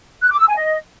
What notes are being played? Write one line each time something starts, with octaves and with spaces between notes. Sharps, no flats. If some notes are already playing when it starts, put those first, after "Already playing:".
F#6
D6
E6
G#5
D#5